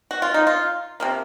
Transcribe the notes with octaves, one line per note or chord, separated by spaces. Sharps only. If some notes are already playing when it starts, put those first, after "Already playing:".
F#4
F4
D#4
F4
C3 F3 A#3